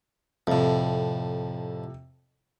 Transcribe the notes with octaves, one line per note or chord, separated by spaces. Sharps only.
F2 A2 C3